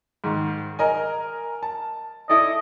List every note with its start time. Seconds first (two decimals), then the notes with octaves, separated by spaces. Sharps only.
0.24 G#2 D#3
0.79 A#4 D#5 G#5
1.63 A5
2.30 E4 A4 D5 D#5